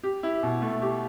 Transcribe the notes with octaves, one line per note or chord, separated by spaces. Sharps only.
G4
E4
B2
A3
G4